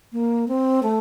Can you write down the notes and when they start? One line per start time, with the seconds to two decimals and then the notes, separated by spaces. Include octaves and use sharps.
0.13 A#3
0.48 C4
0.83 A3